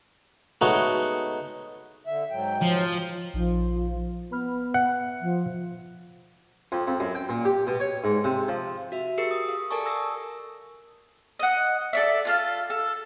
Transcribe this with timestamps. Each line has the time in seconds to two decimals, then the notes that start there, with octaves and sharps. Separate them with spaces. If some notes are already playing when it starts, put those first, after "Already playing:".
0.61 G#3 A3 B3 D#4 F#4 C#5
2.07 D3 E5
2.31 G#2 F#3 G5
2.62 F3
3.34 A#1 F3 D#4
4.31 B3 B4 B5 F6
4.74 E5 F#5
5.22 F3
6.72 F2
6.87 F2
7.00 F#2
7.15 G5
7.29 A#2
7.45 G4
7.67 B2
7.80 C#5
8.04 G#2
8.24 C3
8.48 F3
8.92 F#4 E5
9.18 G4 G#4 A#4 E6 C7 C#7
9.31 D#6
9.49 F5
9.70 A4 A#4 D5 G#5 A5 C#6
9.85 D#6 E6 A#6
11.39 D#5 F#5
11.93 A4 D5 E5
12.25 F4 A4 F5
12.70 A4